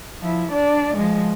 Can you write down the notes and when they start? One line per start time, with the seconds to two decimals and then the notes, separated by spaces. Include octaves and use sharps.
0.21 F3 E4
0.52 D4 D5
0.97 F3 G#3